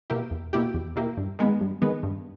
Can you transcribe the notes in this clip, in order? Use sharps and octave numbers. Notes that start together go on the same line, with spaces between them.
B2 A#3 E4 G4
E2
B2 A#3 E4 G4
E2
B2 A#3 E4 G4
G2
D#3 G#3 B3
G2
D#3 G#3 B3
G2